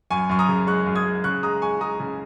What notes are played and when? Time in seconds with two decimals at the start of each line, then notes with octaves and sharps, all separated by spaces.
0.10 F#2 G#5 C#6
0.29 F#2 C#6
0.39 A#5 D#6
0.48 C#3
0.67 G#3 C#6 F#6
0.86 F#2
0.95 D#6 G#6
1.06 G#3
1.24 C#3 C#6 F#6
1.43 G#3 A#5 D#6
1.62 G#3 G#5 C#6
1.81 G#3 A#5 D#6
2.00 C#3